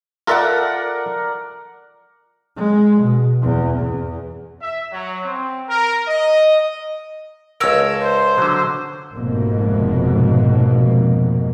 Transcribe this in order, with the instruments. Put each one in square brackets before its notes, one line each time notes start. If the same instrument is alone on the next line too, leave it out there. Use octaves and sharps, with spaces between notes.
[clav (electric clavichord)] F4 A4 E5 [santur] A#4 D5 F#5
[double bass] G#3
B2
E2
E2
[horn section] E5
F#3
C4
A#4
D#5
[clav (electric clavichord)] C#2 A#4 [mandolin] A4 C#5 E6
[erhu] C5
[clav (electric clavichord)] D3 F#3
[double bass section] F1 F2 G#2 B2 A#3